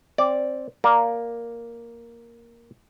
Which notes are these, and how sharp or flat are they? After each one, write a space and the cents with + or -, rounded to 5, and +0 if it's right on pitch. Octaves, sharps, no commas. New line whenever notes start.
C4 +15 D5 -5
A#3 +0 D5 +0